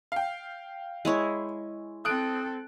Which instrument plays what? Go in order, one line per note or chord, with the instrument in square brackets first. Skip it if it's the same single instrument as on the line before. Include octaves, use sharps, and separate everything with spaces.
[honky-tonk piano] F5 G5
[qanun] G#3 E4 C#5
[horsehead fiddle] C4 A4 [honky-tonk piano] D#6 F#6 D7